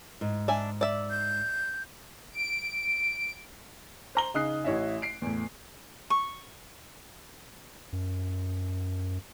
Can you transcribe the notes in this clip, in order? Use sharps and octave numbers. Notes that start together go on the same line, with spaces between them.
G#2
D4 E5 G#5
D5 E5
G6
D7
C5 A#5 G7
C#3 D#4 D#6 F#6 C7
A1 E4 C#5 D#5 E5
C7 D7
E2 A2
C#6
F#2